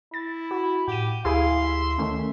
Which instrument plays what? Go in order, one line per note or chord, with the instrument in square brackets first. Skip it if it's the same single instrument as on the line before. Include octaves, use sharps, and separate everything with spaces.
[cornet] E4 [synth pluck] A6
[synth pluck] F#4
[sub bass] A2 [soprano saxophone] G4 [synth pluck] F#5 D#7
[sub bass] D2 [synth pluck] E4 G4 G#4 [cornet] F5 [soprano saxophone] C6
[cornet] E5
[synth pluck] D#3 A3 C#4